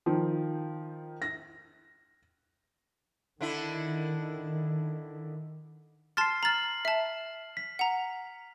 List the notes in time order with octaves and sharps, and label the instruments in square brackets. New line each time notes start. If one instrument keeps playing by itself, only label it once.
[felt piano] D#3 F3
A#6
[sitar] D3 D4 E4 [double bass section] D#3
[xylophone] A5 C6 A6 [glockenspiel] F6 C7
[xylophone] A#5 A6 [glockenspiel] F6 F#7
[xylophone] E5 A5
[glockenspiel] B6
[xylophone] F#5 A#5